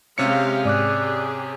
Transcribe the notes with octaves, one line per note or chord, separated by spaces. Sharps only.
C3 G#3 C#4 G4 F5 C#7
G#2 G4 G#4 D5 D6 F#6